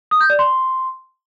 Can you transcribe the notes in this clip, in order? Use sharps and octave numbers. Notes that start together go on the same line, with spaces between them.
D#6
G6
D5
C6